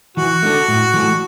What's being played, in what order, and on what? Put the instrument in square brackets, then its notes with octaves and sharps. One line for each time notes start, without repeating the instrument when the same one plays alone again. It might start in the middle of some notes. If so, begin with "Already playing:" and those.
[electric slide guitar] E3 [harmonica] F#4
[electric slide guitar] A3 D4 A4
A2
E3 A3